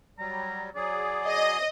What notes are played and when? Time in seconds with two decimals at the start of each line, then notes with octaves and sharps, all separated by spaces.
0.19 F#3 G3 A#5
0.76 F#3 G#4 D5
1.28 D#5